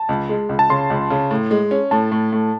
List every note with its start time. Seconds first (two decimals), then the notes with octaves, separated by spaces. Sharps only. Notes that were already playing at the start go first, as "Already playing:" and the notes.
Already playing: A5
0.09 C#2
0.29 G#3
0.49 C#2
0.59 A5
0.70 C#3 C6
0.90 C#2
1.10 C#3
1.31 A2
1.51 G#3
1.71 C#4
1.91 A2 A5
2.12 A2
2.32 A2